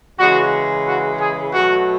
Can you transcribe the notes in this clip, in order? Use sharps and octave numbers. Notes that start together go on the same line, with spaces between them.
C#3 E3 G#3 F#4
F#4
G#4
B2 F#3 A3 F#4